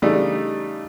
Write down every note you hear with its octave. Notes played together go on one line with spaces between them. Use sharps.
C#3 E3 G3 A3 D4 D#4